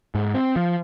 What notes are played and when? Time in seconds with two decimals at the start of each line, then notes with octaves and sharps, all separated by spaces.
0.15 G#2
0.34 C4
0.56 F3